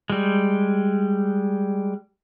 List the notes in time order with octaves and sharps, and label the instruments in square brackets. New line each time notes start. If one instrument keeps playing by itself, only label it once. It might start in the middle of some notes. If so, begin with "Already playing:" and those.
[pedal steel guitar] G3 G#3